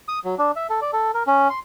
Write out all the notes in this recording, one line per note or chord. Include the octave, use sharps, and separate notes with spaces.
D#6
F#3
D4
E5
A4
D5
A4
A#4
C#4
C6